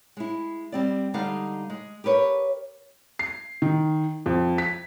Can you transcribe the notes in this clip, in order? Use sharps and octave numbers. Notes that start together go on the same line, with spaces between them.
G#3 E4
G3 C4 D5
D3 G3 G#3 D#4 F5
G#3
G4 A#4 B4 C#5
C7
D#3
F2
B6